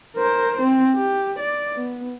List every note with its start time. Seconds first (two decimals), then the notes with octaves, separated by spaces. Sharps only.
0.17 A#4 C5
0.62 C4
0.94 G4
1.39 D5
1.75 B3